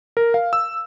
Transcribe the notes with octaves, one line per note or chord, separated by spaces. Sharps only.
A#4
F5
E6